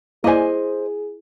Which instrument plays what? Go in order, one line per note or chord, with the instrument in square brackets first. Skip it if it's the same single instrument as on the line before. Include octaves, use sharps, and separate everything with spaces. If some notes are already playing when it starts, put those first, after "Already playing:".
[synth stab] A#3 D5 G#5 [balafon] E4 [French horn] G#4 [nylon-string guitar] C5 D#5